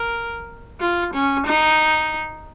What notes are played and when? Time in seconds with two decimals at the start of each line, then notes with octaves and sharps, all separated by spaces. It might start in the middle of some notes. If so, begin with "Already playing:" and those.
Already playing: A#4
0.80 F4
1.14 C#4
1.47 D#4